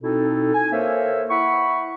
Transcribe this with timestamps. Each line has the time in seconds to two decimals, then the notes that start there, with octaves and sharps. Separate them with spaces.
0.03 B2 C4 D#4 E4 A4
0.54 G#5
0.72 A#3 A4 A#4 C5 C#5 E5
1.30 E4 E5 F#5 B5 C#6